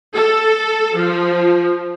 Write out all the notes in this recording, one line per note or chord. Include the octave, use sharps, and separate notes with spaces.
A4
F3